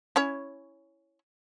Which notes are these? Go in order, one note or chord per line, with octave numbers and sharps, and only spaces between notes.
C#4 E4 C#5